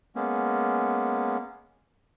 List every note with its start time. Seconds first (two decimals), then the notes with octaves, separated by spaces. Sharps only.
0.16 G#3 A#3 B3 C#4